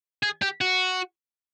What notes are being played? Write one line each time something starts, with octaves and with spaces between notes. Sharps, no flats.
G#4
G4
F#4